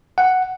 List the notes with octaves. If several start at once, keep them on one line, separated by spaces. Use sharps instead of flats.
F#5